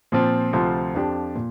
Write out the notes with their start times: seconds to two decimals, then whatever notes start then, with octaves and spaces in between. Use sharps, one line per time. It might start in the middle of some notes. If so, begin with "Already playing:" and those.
0.12 A#2 F3 C4 F4
0.53 D2 C3 F3 C4 F4
0.94 F2 F3 D4 G4
1.35 A#2